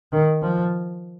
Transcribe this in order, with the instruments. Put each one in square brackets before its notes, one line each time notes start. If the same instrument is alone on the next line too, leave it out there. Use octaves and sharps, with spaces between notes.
[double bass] D#3
F3